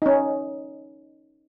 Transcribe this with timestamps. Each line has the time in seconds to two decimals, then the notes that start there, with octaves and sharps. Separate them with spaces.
0.02 D#4
0.06 C#4